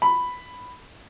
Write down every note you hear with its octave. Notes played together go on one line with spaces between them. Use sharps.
B5